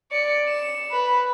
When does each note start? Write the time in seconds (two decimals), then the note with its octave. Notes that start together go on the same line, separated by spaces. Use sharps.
0.11 D5 C#7
0.49 E7
0.91 B4